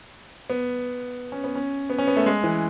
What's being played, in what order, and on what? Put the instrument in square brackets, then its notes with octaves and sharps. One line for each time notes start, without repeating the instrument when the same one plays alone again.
[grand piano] B3
C#4
B3
C#4
B3
C#4
B3
A3
G#3
E3